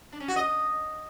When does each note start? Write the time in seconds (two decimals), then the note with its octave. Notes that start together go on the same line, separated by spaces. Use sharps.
0.12 D4
0.20 C#4
0.28 F#4
0.36 D#5